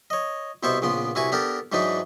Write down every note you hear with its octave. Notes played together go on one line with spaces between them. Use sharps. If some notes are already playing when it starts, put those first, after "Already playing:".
C#5 D#5
C2 B2 B3 C5 E5 C#6
A#1 C#3 B3 C6
C2 E4 F#4 B4 G#5 C#6
B3 D4 G4 A4 A#4
G#2 E3 F#3 D4 D#4 B4